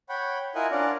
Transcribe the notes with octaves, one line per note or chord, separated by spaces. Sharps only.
C#5 F#5 G5 B5
E4 F4 A#4 D#5 F#5 G#5
C#4 D4 F4 A#4 D5 F#5